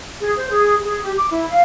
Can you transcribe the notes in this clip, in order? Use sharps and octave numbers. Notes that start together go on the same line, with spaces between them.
G#4
C5
G#4
G#4
G4
D6
E4
F5